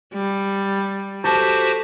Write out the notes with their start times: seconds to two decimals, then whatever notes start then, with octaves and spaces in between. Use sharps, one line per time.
0.14 G3
1.24 F#4 G4 A4 C5